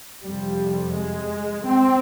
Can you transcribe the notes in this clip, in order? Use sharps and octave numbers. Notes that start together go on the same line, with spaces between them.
F2 C3 G3
G#3
C4